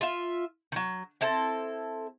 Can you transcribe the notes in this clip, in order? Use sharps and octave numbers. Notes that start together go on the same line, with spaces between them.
F4 E5
D#3 F#3
C4 E4 A4 A5